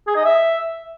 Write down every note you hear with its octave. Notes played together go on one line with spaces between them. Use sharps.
G#4
D#5
E5